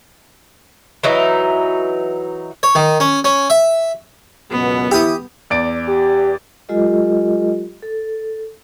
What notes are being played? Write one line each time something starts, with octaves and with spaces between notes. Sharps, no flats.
E3 F#3 D#4
C#5
D#3
C#4
C#4
E5
C#2 F#2 B2 B3
E3 E4 G4 D#6
E2 D5 D7
G4
F#3 G#3 F4 G4 A4 D#5
A4